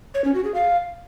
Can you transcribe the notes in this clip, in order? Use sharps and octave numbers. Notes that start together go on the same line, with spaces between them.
C#5
C#4
F#4
G#4
F5